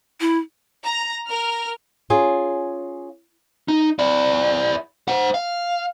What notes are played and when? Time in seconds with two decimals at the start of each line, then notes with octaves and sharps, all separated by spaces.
0.21 E4
0.84 A#5
1.29 A#4 F6
2.10 C#4 F4 G#4
3.68 D#4
3.99 E4 D5
5.08 C5 F#5
5.34 F5